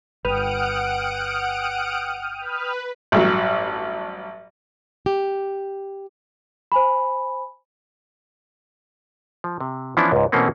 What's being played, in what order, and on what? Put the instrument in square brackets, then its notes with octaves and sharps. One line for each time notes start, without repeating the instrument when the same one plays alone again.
[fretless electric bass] G1 [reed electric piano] B4 [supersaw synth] F#5 D7 [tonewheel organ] G5 D#6 F6
[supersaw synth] B4
[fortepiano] A1 G2 F#3
[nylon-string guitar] G4
[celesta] C5 G#5 B5
[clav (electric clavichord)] F3
C3
E3 F3 B3 C#4 D4 E4
C#2 G#2
B2 E3 A3 A#3 C4 C#4